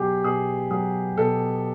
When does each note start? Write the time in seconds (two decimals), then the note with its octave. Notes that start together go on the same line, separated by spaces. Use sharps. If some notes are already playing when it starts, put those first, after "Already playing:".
Already playing: B2 F#3 G4 G#4
0.24 B2 G#4
0.71 F#3 G#4
1.17 B2 A4